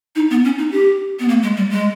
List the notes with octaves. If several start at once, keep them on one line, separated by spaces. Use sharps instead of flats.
D#4
B3
C#4
D#4
G4
B3
A#3
G#3
G3
G#3